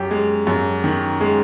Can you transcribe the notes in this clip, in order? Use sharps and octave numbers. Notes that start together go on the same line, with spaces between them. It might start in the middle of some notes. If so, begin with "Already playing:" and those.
Already playing: F#2 G4
G#3
F#2
D#3
G#3